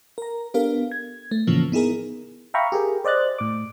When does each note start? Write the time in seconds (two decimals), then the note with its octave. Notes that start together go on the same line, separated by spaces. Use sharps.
0.18 A#4 A#5
0.54 B3 D4 G4 A4 A#4 F5
0.92 G#6
1.31 A3
1.47 A2 C#3 E3 F3 A#3 C#4
1.72 B3 D#4 E4 G#4 A#4
2.54 E5 F5 G5 A#5 B5 C#6
2.72 G4 G#4 A#4
3.05 C5 D5 D#5 F#6 A6
3.38 A2 D6